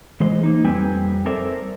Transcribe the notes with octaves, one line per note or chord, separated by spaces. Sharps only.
E3 G#3 C5 D#5
A#3 D#4
F2 G3 C4 B4 G5 G#5
A4 A#4 C5 D5 E5